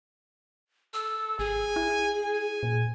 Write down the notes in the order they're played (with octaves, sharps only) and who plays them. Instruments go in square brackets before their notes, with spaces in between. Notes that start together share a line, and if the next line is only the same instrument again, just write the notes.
[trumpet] A4 [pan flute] E6
[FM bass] G#1 [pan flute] G#4 [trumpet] G#5
[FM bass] E4
[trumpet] G#5
[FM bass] A#2